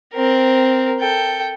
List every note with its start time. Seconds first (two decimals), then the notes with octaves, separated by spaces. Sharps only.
0.14 C4 A#4
1.00 A4 G5